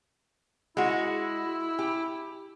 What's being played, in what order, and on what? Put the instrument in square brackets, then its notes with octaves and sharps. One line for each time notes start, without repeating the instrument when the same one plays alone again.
[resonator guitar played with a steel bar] G#3 F#4 [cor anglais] E4
[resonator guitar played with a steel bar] G4